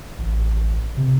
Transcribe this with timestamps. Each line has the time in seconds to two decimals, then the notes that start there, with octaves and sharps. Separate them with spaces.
0.18 A1
0.97 C3